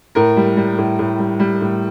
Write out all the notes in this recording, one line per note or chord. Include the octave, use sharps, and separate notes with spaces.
A2 A#4
G3
G3
A2
A2
G3
G3
A2